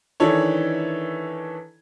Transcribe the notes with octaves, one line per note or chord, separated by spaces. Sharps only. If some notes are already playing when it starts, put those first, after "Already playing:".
D#3 E3 D4 E4 A4 C#5